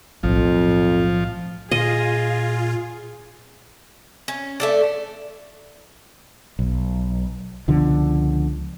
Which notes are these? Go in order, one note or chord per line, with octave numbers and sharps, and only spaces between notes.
B1 F2 A2 F3
A#2 F4 G#4 D#5
C#4
A3 A4 D5
B1
C#2 B2 D3 F3